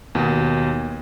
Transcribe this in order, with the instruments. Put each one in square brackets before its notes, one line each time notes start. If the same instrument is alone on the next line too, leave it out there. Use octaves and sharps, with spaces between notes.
[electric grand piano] D#2 B2